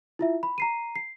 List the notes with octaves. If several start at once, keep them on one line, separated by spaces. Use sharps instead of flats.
E4 F4 E5
B5
A#5 C7 D#7
C7